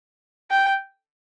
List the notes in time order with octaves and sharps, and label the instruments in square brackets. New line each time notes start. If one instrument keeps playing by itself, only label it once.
[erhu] G5